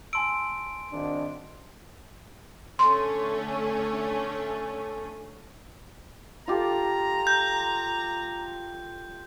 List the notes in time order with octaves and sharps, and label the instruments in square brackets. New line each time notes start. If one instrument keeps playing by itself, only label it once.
[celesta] G#5 A5 E6 [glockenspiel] C6 D7
[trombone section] G#1 D4
[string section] D3 A3 C#4 [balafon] C6
[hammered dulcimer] F4 G4 A4 [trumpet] A#5
[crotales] G6